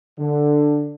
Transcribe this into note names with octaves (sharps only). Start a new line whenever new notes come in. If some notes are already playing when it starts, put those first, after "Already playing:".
D3